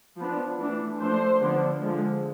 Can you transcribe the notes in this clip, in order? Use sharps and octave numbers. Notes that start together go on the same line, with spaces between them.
F3 B3 D4
E3 A3 D4
F3 A3 D4 C5
D3 F3 B3 D4
D3 F3 G#3